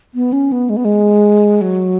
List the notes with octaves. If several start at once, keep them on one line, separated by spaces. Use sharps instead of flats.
B3
C#4
B3
G#3
B3
G#3
F#3